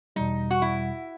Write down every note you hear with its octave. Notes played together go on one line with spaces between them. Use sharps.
E2 B2 G3 D#4
F#4
E4